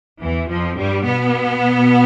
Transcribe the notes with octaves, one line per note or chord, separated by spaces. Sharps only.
E2 E3
F2 F3
G2 G3
B2 B3